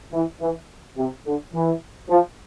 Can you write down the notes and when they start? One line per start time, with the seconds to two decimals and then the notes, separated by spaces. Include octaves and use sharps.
0.13 E3
0.41 E3
0.97 C3
1.25 D3
1.53 E3
2.09 F3